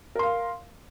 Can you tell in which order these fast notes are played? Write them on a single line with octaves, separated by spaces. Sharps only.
A#4 C6 F5